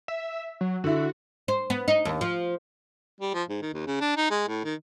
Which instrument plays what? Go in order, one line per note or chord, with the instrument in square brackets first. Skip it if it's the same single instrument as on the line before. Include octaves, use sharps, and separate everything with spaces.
[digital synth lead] E5
F#3
[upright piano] D3 E4 [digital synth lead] F#4
[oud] C5
B3
D#4
D#2
F3
[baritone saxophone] G3
F3
G#2
D#3
D#2
C#3
D4
D#4
G#3
A2
D#3